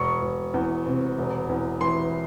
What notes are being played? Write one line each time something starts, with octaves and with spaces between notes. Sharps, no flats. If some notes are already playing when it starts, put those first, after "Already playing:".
Already playing: E1 C#6
E1
E2
C3
E1
E2
E3 C6